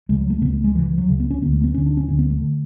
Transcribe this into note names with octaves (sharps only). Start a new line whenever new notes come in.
C#2 C#3 G#3
F#3
A3
C#2 C#3 B3
A3
G#3
C#2 C#3 E3
E3
F#3
C#2 C#3
B3
C#4
D2 D3 B3
A3
B3
D2 D3 C#4
D4
C#4
D2 D3 C#4
B3
A3
D3